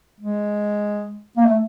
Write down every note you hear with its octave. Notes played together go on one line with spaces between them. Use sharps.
G#3
A#3
A3